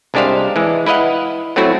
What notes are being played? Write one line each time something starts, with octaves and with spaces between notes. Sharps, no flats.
C2 G#3 D4 G4 C5 F5
E3 G#3
E4 B4 D#5 F5 F#5
F#3 A3 C4 E4 F#4